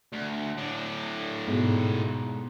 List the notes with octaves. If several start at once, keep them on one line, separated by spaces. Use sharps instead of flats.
D2
A2 D4
G#2 B2